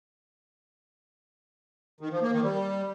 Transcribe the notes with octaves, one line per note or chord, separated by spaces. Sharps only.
D#3
F3
A#3
D#3
G3